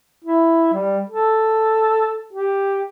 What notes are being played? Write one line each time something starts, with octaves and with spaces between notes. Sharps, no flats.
E4
G3
A4
G4